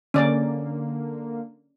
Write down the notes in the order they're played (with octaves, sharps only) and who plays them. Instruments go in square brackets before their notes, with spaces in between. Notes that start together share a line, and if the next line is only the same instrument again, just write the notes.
[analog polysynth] D3 A#3 [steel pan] C#4 D5